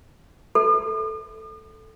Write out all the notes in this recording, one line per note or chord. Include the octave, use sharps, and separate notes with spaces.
A4